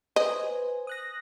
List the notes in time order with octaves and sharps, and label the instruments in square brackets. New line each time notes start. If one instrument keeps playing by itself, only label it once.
[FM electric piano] B4 C5 G#5 [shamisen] D#5
[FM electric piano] D#6 F#6 A#6